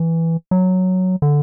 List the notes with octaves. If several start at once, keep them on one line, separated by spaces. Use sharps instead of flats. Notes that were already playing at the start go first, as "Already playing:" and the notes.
Already playing: E3
F#3
D3